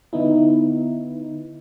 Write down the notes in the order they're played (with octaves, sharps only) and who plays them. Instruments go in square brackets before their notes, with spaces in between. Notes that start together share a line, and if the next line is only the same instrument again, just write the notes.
[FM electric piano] D3 B3 D#4 E4